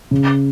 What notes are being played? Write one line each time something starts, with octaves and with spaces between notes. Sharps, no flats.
C#3